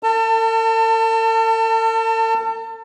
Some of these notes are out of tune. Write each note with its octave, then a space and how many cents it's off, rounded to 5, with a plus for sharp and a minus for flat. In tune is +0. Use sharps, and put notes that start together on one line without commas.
A4 +45 A5 +30